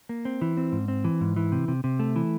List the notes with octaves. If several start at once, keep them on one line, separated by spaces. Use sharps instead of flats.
A#3
C4
E3
C4
G#2
C4
E3
G#2
E3
C3
C3
C3
A3
E3